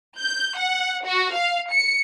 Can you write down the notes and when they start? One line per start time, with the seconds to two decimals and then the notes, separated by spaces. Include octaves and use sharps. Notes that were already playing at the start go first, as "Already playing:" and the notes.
0.18 G6
0.58 F#5
1.04 F#4
1.33 F5
1.71 C#7